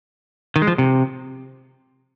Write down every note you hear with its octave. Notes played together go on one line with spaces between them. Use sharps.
D#3
G#3
F3
C3